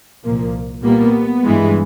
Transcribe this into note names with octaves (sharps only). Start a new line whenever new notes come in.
C2 A#2 F3 A#3
A#2 G3 A#3 B3
G2 E3 G#3